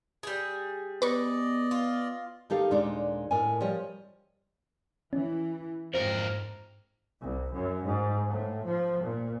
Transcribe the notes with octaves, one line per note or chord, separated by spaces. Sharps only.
G3 G#4
B3 B4 D5 D#5 C#6
F4
D#3 D#4 G4 A4 F5
D#2 A#2 G#3 D4 D#4 D5
A2 A#4 D#5 G#5
F3 G3 C#5 D#5
E3 C#4
F2 G#2 A#4 C5
C2
F#2
G#2
A2
F3
A#2